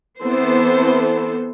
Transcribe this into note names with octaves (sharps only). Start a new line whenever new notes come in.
E3 B3 C4 A4 C5